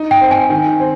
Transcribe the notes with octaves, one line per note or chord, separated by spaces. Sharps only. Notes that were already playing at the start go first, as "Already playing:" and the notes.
Already playing: D#4
G5
C4
G#5
D#3
C4